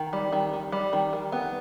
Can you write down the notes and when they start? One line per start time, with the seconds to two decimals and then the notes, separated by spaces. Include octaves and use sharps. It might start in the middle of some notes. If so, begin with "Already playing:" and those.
Already playing: D#3
0.13 G3
0.32 D#3
0.53 D#3
0.72 G3
0.93 D#3
1.13 D#3
1.32 B3